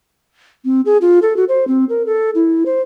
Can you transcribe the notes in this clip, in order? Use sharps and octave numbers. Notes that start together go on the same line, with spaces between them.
C4
G#4
F4
A4
F#4
C5
C4
A#4
A4
E4
C5